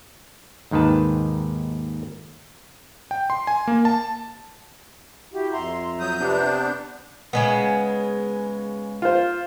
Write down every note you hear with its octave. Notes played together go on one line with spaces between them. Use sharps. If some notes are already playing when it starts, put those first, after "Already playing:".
D#2 G#2 D#3 B4 A5
G5
C6
G#5
A#3
A5
E4 F#4 G4
F2 E5 A#5 C6
F#3 D#6 G6
C3 B3 D4
C#3 G#3 B3
F4 C5